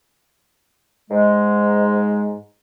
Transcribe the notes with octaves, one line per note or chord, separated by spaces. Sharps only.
G#2 G#3